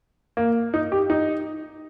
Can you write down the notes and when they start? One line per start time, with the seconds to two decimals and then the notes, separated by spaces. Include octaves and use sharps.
0.37 A#3
0.74 D#4
0.92 G4
1.10 D#4